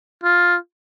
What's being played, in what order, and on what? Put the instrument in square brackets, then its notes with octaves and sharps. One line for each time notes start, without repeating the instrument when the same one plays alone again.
[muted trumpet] F4